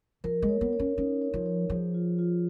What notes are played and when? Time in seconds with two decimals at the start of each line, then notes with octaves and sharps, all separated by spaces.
0.24 F3 A#4
0.42 G#3
0.49 C#5
0.61 B3
0.73 C#5
0.80 C#4
0.97 C#4 D#4
1.22 C#5
1.34 F3
1.46 C#5
1.70 F3 G#4
1.94 F4
2.19 F4